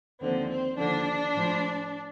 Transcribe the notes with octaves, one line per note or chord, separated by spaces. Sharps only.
D#2 D3 F3 C4
C4
D#2 D3 F3 D4
A2 F3